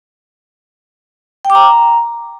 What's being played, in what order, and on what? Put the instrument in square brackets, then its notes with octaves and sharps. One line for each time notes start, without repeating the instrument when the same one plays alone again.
[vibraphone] G5
D6
A#5